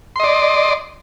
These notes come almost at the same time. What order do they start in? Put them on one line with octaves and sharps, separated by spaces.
C6 D#5 D5